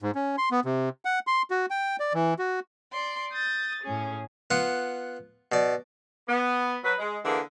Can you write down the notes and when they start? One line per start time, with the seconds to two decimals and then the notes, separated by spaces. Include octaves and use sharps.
0.02 G#2
0.15 C#4
0.38 C6
0.51 B3
0.65 C3
1.05 F#5
1.27 C6
1.51 F#4
1.70 G5
2.00 D5
2.14 E3
2.39 F#4
2.92 D5 C6
3.34 D#6 G6 A6
3.82 A2 C#4 G#4
4.51 B3 F4 F#5
5.52 B2 D5
6.28 B3
6.84 F#3 B4
6.99 G#3
7.25 D3 E3 A#3 G#4